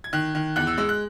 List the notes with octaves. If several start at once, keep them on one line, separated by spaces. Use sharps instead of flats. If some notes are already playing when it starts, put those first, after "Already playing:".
G#6
D#3 F#6
D#3
E2 F#6
E6
G#3 E6
F#6